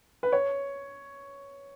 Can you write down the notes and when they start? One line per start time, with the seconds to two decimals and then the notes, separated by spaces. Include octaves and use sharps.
0.23 B4
0.32 C#5